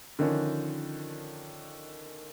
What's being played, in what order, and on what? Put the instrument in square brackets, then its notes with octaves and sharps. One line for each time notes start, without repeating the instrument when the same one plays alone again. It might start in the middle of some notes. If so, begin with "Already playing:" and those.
[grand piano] D3 D#3 F3 C#4 D4